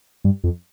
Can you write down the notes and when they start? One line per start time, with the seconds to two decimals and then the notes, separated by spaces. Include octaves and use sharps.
0.24 G2
0.44 F2